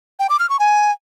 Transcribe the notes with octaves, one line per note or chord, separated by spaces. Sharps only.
G5
D6
F6
C#6
G#5